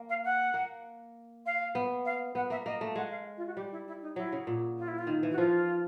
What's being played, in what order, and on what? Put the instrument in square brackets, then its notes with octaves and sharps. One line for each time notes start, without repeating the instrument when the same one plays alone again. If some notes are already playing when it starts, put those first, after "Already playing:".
Already playing: [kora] A#3
[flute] F5
F#5
[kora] A#3
[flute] F5
[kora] B3
[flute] F5
[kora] B3 [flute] F#5
[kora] A#3 [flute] E5
[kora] A#3 [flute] D#5
[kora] A3
[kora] G#3 [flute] F#5
[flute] F5
F4
F#4
[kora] G3 [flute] G4
[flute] E4
E4
D#4
[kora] F#3 [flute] E4
[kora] C#3
A#2
[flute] F4
E4
F4
[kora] D#3
E3
[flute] F#4
[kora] F3 [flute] F4